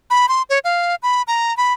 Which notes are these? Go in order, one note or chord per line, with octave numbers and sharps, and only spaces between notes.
B5
C6
C#5
F5
B5
A#5
B5